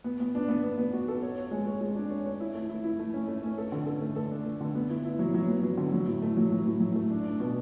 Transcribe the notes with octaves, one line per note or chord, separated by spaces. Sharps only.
B3
B3
D4
B3
B3
B3
F#4
A4
C#5
C#5
G#3
C#5
G#3
D4
C#5
C#5
E4
A3
E4
E4
A3
C#4
A3
C#4
A4
D3
A4
A3
A4
D4
A3
D3
B3
E4
E4
F#3
F#3
B3
F#3
D3
F#3
A2
A3
F#3
F#3
A2
F#3
A3
D4
D4
B2